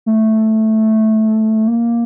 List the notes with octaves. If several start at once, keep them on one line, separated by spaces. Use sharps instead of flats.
A3
A#3